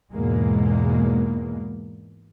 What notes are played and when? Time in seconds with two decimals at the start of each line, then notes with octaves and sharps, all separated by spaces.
0.13 E2 G#2 B2 G#3 A#3